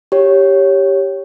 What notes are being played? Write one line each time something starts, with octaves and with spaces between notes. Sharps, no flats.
G4 C#5